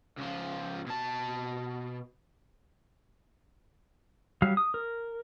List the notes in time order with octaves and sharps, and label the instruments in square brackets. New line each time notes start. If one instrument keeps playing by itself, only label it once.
[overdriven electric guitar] C#2 F3
B2 A5
[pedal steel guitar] F#3 G3 F5
D#6
A#4